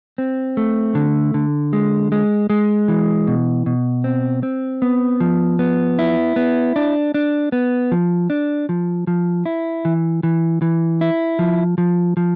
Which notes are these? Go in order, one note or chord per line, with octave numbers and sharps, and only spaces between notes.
C4
A3
D3
D3
G#3
G#3
G#3
E3
B2
B2
C4
C4
B3
F3
B3
E4
B3
D4
D4
B3
F3
D4
F3
F3
E4
E3
E3
E3
E4
F3
F3
F3